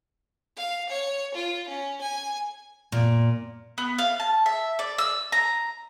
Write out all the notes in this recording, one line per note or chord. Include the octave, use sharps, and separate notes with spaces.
F5
C#5
F4
C#4
G#5
A#2
B3
F5
A5
E5
D5
E6
A#5